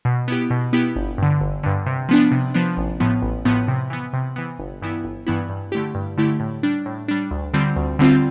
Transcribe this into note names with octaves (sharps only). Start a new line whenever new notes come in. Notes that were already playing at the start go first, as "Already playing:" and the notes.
B2
B3 E4 G4
B2
B3 E4 G4
G1
G2 D3
G1
G2 D3
C3
F3 B3 D4
C3
F3 B3 D4
A1
A2 F3 B3
A1
A2 F3 B3
C3
E3 B3
C3
E3 B3
G1
G2 E3 B3 E4
G1
G2 E3 B3 E4
G2
D3 A3 E4 G4
G2
D3 A3 E4 G4
A2
G3 D4
A2
G3 D4
D2
D3 G3 C4 F4
D2
D3 G3 C4 F4